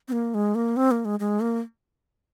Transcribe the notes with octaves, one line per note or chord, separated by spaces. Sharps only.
C4
A#3
G#3
A#3
C4
A#3
G#3
G#3
A#3